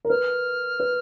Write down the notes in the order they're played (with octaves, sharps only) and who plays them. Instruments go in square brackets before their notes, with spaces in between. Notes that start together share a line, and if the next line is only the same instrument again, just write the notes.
[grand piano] A#4
[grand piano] B4 [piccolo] F6
[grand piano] B4